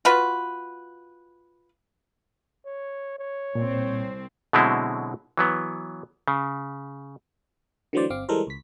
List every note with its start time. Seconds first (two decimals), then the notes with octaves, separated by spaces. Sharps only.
0.05 F4 F#4 B4
2.66 C#5
3.19 C#5
3.55 C2 A#2 C4
4.53 B2 D3 F#3 G#3 C4 E4
5.37 E3 F#3 B3
6.28 C#3
7.93 D3 E3 F#3 A3 C5 D5
8.10 G1 C4 F5 D6
8.29 E3 G3 G#3 A4 A#4 C5
8.47 C#2 B6